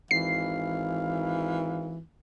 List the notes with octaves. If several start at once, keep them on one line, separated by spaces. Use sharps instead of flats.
G#1 E3 F5 C7